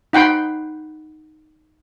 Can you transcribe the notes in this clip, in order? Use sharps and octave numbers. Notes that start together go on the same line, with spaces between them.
D#4 F#5 G5 B5 C6